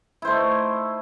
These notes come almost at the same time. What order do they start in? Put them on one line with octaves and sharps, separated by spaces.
E4 C5 A3 D#4